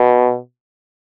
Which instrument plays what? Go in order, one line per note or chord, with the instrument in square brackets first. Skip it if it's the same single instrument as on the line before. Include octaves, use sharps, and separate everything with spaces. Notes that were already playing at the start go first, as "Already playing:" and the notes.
Already playing: [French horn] B2